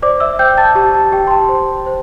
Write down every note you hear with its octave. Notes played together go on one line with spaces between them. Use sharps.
C5 D5 D6
E5 E6
C5 G5 G6
A5 A6
G4 A5
A5
G4 G5
C6
A5
C5
C5